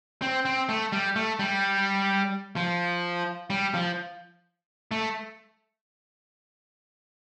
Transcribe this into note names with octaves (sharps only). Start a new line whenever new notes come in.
C4
C4
A3
G3
A3
G3
F3
G3
F3
A3